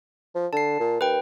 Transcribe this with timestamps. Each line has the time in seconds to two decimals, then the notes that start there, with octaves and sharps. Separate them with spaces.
0.35 F3
0.53 D3 A5 C7
0.80 A#2
1.01 D#2 B4 G5